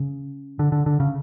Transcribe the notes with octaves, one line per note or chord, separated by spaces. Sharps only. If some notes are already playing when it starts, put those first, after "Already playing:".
Already playing: C#3
D3
D3
D3
C#3